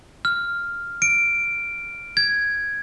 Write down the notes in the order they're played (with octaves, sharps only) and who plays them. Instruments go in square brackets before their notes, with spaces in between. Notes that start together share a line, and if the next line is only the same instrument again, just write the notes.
[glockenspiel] F6
D7
G#6